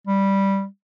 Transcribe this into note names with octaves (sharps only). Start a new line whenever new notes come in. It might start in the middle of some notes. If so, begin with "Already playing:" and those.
G3